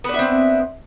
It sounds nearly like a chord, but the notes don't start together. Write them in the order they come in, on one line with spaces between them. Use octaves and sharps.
B3 D4 E5 C4